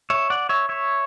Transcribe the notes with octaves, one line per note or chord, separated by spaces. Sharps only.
C#5 E5
D5 F#5
C#5 E5
C#5 E5